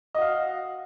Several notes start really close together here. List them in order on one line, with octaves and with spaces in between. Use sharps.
D#5 F#4 F5